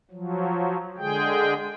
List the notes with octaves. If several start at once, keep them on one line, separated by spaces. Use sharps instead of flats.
F3 F#3
D3 G#3 G#4 G5